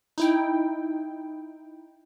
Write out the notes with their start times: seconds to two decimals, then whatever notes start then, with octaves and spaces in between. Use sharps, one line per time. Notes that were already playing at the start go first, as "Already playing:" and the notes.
0.18 D#4 E4 G5